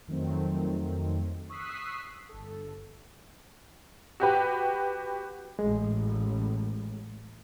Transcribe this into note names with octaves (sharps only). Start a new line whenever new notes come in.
F2 D#3 F#3 A3 C4
C#6 D#6 E6 F#6 B6 C7
G1 A4
F#4 G4 B4
A1 G#3